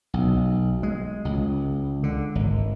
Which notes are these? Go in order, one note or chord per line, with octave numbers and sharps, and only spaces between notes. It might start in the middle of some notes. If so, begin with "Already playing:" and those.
B1
G#3
C#2
D3
G#1